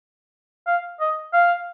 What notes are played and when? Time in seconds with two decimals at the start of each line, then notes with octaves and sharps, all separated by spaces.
0.67 F5
1.00 D#5
1.33 F5